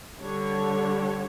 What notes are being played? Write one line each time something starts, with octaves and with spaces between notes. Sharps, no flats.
D3 G3 D4 C#5